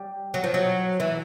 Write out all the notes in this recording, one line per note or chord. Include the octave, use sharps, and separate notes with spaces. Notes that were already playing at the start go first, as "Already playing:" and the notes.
Already playing: G3
F#3
F3
F#3
E3